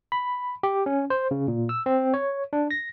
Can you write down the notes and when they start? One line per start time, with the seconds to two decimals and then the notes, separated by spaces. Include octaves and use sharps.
0.12 B5
0.63 G4
0.86 C#4
1.10 C5
1.31 C#3
1.48 A#2
1.69 E6
1.86 C4
2.14 C#5
2.53 D4
2.71 A#6